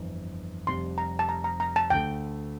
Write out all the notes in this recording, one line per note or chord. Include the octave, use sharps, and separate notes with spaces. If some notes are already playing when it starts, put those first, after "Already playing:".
Already playing: G1 F2 E3
F1 F2 C3 G3 C6
A#5
A5
A#5
A#5
A#5
A5
D2 D3 A3 G5